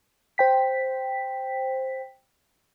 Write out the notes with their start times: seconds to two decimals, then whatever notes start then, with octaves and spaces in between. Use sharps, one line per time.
0.38 C5 G5 B6